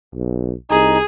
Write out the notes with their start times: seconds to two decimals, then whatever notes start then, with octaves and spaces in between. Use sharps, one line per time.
0.15 B1
0.70 C2 D#4 G#4